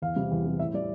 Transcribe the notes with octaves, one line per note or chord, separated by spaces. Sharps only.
E2 F5
C3 G3
E2
C3 G3
A2 E5
G3 D5